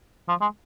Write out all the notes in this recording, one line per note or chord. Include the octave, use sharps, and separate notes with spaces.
F3
G#3